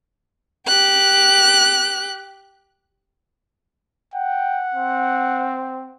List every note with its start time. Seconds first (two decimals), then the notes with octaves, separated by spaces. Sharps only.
0.67 G4 F#6
4.14 F#5 G5
4.74 C4